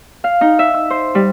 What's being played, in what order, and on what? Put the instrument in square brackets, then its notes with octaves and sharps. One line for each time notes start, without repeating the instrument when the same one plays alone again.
[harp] F5
D#4
E5
E6
C5
G3